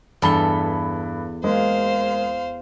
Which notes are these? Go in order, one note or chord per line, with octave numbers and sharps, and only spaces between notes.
E2 G2 A4 B5 G7
G#3 A#3 C5 F5